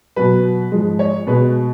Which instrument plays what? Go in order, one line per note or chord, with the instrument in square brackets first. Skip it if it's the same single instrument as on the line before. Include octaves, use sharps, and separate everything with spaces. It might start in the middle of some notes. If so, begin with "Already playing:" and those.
[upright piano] B2 F#3 B4
G#2 F3 G#3
C#5
B2 G#3 B4